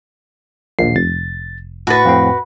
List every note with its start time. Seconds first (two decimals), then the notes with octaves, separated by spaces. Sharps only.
0.79 A#1 D#2 C7
0.96 F1 A6
1.87 A2 F#4 B4 A6
2.05 F2 A2 C4